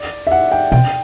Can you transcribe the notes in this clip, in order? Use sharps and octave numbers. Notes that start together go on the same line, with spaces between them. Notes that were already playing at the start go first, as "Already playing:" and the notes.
Already playing: D5
E5
F#5
G5
B2 G5